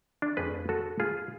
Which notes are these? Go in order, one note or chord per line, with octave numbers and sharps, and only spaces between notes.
D4
F2 F3 A3 G#4 B4
F#4 A4
F4 G#4